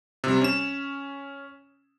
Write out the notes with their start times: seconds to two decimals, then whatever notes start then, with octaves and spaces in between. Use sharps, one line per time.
0.24 C3 G3
0.41 C#4 E7